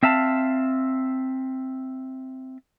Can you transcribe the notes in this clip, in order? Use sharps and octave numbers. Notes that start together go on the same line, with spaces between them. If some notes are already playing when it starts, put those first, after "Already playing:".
C4 E5 F5 A5